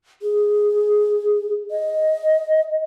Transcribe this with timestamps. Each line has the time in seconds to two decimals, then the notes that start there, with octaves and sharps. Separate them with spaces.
0.22 G#4
1.71 D#5